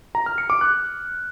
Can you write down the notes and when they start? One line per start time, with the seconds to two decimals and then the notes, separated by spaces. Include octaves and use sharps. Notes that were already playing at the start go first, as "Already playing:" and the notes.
0.15 A#5
0.26 F6
0.38 C#7
0.50 D6
0.61 F#6